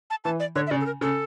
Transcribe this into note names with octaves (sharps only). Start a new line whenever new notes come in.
A5
E3 A5
D5
D3 C#5
E5
C#3 D5
A4
A#4
C#3 A4